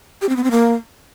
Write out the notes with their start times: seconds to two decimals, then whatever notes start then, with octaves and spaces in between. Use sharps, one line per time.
0.22 G4
0.29 C4
0.36 B3
0.44 C4
0.51 A#3